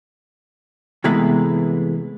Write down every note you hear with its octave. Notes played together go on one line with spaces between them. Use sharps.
C3 E3 G#3 A3 B3 B4